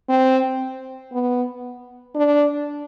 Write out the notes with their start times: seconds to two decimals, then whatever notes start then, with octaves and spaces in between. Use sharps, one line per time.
0.09 C4
1.12 B3
2.15 D4